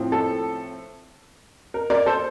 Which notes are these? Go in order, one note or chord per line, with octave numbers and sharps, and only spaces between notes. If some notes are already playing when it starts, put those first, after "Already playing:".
Already playing: A2 F3 C4
A4
A#4
A#4 D5
A4 C5